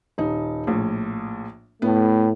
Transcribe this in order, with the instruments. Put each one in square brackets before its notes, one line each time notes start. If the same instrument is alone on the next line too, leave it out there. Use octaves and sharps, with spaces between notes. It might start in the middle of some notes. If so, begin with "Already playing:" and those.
[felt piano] D#1 D#4
A#1 A2
[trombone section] A2 A3 [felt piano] B3